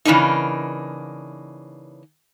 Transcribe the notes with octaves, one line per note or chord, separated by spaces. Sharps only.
C#3 E3 A#3 D4 D#4